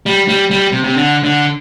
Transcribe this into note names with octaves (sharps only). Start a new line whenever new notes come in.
G3
G3
G3
C3
C3
D3
D3